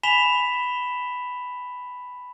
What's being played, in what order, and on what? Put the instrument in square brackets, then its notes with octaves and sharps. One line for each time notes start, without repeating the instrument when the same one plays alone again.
[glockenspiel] G#5 B5 B6 E7 F7 G7